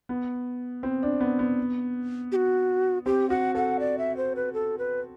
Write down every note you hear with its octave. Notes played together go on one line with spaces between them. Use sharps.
B3
C4
D4
B3
B3
G4
F#4
C4 G4
F#4 F#5
A4 F#5
D5
E5
C5
B4
A4
B4